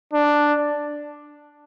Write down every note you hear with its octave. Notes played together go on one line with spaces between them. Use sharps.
D4